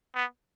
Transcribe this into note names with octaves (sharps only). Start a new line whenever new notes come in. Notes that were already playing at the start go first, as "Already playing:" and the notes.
B3